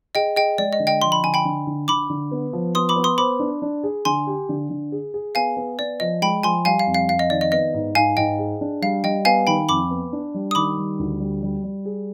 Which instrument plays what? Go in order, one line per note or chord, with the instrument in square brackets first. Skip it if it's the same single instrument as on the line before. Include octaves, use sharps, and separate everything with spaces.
[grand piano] G#4 [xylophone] D#5 G5
[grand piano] G#4 [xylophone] D#5 G5
[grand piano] G#3 [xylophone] D5
[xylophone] D#5
[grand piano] D3
[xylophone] D#5 G5
[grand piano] F3 [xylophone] C6
[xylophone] B5
[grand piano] D3 [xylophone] G#5
[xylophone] G5 B5
[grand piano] D3
D3
[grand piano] D3 [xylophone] B5 D6
[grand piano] D3
B3
F3
[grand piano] B3 [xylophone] C6 D#6
[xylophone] B5 D6
[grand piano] B3
[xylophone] C6 D#6
[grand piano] C5 [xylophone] B5 D6
[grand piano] D4
D4
G#4
[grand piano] D3 [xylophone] G#5 C6
[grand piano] G4
D3
D3
G#4
G#4
[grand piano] B3 [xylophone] F5 G#5
[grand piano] B3
[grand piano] B3 [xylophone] D5
[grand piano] F3 [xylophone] D#5
[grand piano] G#3 [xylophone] G5 B5
[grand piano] F3 [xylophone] G#5 C6
[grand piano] G3 [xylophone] F5 G#5
[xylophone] F5
[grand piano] F2
[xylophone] F5
[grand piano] F2 [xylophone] F5
[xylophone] D#5
[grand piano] D#3 [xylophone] D5
[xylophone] D#5
[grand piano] B3 [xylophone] D#5
[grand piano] G#2
[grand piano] G#2 [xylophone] F5 G#5
[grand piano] G#2 [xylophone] D#5 G5
[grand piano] G#4
D4
[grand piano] G3 [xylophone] F5
[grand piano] G3 [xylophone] D#5 G5
[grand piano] B3 [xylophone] F5 G#5
[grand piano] D#3 [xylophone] G5 B5
[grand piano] F2 [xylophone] B5 D6
[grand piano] B3
D4
G3
[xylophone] D#6
[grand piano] D#3 [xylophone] B5 D6
[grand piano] G3
D2
G3
G3
G3
G#4